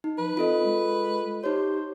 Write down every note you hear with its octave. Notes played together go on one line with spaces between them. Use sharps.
D#4
F3 B4
C4 F4 A4 D#5
G#3
D#4 G4 C5 C#5